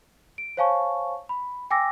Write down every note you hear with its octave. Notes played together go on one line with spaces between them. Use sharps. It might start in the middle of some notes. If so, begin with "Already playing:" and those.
D7
C5 C#5 F5 G#5 A5 C#6
B5
G5 G#5 D6 E6 A#6